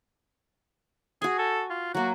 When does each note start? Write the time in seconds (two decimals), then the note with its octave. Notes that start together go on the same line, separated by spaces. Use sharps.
1.22 F#4 G#4 G#5
1.39 A4
1.70 F4
1.94 F#3 A#3 F#4